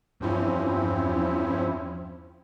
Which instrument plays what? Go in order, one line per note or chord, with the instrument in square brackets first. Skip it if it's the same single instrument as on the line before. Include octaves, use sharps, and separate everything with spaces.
[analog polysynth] E2 G2 F3 C4 C#4 E4